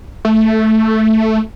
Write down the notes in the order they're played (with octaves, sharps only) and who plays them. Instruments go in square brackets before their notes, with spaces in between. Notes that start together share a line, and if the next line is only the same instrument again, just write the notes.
[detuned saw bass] A3